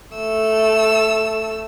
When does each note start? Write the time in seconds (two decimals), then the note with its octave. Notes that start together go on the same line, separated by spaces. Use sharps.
0.15 A3 E6